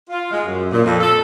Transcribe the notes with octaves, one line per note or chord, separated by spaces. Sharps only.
F4
G#3
F#2
A#2
F2
A4